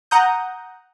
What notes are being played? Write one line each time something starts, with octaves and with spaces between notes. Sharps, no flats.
F#5 A#5 D#6 G6